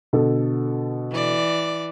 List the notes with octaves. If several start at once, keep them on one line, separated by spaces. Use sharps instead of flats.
B2 D3 A4
E3 D5